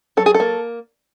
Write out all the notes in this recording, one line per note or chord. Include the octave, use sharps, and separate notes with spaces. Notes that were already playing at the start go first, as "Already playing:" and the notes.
F#3 A4
G#4
A4
A#3